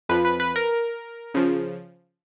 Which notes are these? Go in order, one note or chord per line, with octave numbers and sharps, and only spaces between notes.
F2 F3 B4
B4
B4
A#4
C#3 F3